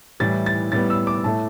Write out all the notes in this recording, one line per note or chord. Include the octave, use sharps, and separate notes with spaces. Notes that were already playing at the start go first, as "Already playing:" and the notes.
A2 E3 G3 A6
A6
A2 G3 B3 A6
E6
D6
A2 A3 A5